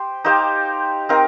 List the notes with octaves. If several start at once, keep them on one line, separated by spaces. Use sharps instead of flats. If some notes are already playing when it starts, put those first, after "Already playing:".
Already playing: G4 C5
D#4 G4 C5 F5
C4 D#4 A#4 F5